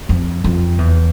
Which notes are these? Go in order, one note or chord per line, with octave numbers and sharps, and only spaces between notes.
F2
F2
E2